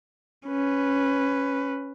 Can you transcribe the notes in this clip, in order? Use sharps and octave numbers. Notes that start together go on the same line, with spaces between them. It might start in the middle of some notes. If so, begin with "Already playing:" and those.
C#4 B4